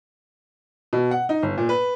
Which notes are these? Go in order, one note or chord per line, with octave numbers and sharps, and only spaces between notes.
B2
F#5
D#4
G1
A#2
B4